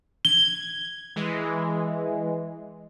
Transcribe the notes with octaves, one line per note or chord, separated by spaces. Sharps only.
G#6 G7
E3 G#3